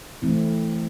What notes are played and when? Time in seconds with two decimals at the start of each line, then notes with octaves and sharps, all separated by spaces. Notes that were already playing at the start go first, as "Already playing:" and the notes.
0.22 E3 A3 C4 E4